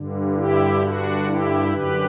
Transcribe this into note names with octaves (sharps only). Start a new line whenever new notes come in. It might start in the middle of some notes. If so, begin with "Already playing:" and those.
Already playing: G2 D3
E4 G4
D4 F#4
E4 G4
F#2 D3 G4 B4